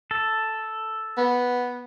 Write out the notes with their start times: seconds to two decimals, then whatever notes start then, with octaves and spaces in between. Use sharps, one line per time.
0.11 A4
1.18 B3